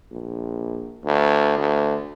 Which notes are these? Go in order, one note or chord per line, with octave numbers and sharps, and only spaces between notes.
A#1
D2
D2